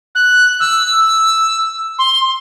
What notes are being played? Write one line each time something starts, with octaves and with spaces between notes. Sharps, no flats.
F#6
E6
C6